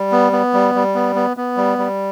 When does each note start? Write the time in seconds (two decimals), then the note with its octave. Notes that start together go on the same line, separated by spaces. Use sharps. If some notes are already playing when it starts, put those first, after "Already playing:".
Already playing: G3
0.12 B3
0.32 B3
0.54 G3
0.75 G3
0.95 B3
1.15 B3
1.37 B3
1.57 G3
1.78 G3